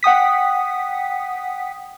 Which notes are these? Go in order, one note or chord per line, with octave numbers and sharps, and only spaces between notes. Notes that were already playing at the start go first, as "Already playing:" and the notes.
F#5 G5 D#6 B6